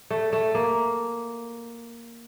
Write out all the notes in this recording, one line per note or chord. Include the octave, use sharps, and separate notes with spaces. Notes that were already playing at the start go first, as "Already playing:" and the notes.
A3
A3
A#3